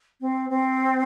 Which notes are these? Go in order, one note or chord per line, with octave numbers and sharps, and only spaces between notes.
C4
C4